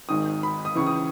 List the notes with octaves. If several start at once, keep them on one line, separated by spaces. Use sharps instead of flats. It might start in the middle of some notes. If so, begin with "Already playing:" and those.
G#1 G#2 D#3 D#6
B5
D#6
C#2 C#3 E3 C#6
D#6